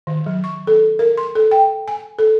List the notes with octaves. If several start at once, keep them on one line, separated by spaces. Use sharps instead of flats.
D#3
F#3
C#6
A4
A#4
C6
A4
G5
G#5
A4